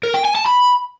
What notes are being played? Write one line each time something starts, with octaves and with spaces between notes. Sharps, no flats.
A#4
G5
G#5
A5
B5